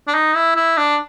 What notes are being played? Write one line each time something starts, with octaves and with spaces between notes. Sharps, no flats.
D4
D#4
E4
E4
D4